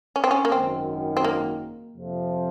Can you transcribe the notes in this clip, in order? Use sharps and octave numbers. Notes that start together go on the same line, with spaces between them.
C#4
C4
C#4
A#3
G#1 F#2 D#3 C4
C4
A#3
F2 C3 F3